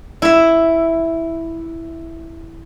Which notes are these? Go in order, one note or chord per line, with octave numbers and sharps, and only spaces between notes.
E4 E5